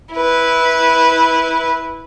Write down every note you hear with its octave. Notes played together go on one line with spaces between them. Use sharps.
E4 B4